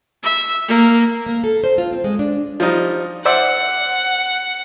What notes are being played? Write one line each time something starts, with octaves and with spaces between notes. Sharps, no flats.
E5
A#3
A#3
A4
C5
F4
C4
G#3
D4
F3 G3 D#4
C5 D5 E5 F#5